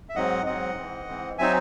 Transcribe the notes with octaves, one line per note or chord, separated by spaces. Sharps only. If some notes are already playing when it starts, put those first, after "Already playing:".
E5
G#2 F#3 C4 D#5 F#5
G#2 F#3 C4 D#5 F#5
G#2 E3 C4
G#2 E3 C4
F#3 C4 D#4 E5 G#5